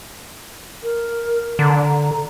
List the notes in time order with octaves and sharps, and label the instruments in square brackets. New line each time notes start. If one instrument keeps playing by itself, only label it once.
[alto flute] A#4
[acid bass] D3 [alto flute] A#5